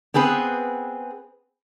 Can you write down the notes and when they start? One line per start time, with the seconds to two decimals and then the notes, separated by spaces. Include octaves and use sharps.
0.14 B3 C4 G#4 B4